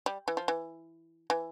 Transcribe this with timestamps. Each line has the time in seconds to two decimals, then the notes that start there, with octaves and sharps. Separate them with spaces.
0.06 G3
0.28 E3
0.37 F3
0.48 E3
1.30 E3